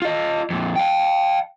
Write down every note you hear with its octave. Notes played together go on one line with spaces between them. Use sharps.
F4 D#5
F2 A#2
F5 G5